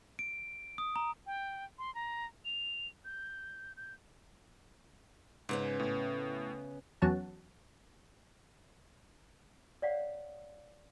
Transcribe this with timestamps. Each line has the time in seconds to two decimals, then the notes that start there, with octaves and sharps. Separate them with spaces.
0.19 D7
0.78 D#6
0.96 A#5
1.26 G5
1.79 C6
1.95 A#5
2.45 F7
3.05 G6
3.77 G6
5.49 G#2 C#3 B3 C#4
5.80 A2
7.02 E2 F#3 C#4 F#5 A5
9.82 C#5 D5 F5 F#5